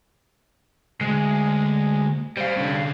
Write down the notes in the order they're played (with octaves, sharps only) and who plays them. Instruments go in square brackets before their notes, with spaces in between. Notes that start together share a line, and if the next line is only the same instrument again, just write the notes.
[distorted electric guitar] D2 [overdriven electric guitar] G#3
[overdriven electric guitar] G3 F5 [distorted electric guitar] C5
[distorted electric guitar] D3 C#4